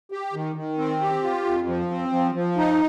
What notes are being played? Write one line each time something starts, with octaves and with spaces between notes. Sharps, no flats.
G4
D#3
D#3
C4
G4
F4
F2
F3
C4
F3
F3
D#4